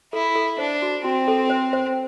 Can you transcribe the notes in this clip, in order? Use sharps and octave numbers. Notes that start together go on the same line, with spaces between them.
E4 A4
A4
D4 C5
F#4
C4 F#4
A4
C5
C5